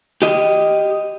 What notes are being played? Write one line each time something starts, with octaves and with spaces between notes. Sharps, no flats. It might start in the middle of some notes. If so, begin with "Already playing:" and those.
G4 D#5